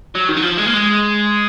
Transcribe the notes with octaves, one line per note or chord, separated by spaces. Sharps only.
F#3
D#3
F#3
F3
G#3
A#3
G#3